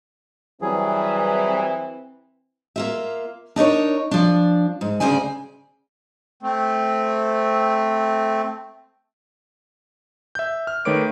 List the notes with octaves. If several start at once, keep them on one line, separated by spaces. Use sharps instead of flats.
E3 F#3 G3 C4 G#4
A#3 F4 E5
D4 D#4 A#4 C#5
F3 D4
G#2
D2 G2 C#3 C5 D5 G#5
A3 C4
E5 G6
F6
D#3 A3 B4 C#5 D6 D7